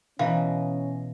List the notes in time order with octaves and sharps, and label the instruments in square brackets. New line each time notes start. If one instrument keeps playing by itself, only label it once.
[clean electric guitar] B2 D#5 [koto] E3 [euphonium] C#4 [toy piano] F5 A#5